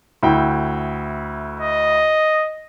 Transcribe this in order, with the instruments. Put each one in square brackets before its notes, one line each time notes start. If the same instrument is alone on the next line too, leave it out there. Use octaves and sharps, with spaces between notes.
[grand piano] D2 E4 G5
[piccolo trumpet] D#5